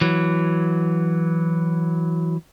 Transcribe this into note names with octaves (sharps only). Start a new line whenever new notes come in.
E3 F#3